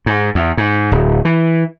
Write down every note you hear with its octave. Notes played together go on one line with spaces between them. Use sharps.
G#2
E2
G#2
D1
E3